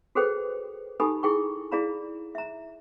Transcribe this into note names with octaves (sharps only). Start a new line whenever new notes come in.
F#4 G#4 A4 B4 C5 G5
D#4 G4 A4 G#5 B5 D#6
E4 G#4 G5 C#6
E4 G#4 D5 F5 A#5 B5
E5 A#5